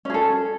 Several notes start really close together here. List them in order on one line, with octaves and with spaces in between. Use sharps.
C#4 G#4 A4